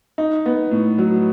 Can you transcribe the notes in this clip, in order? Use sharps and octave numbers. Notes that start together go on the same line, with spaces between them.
D#4
B3
A2
F#3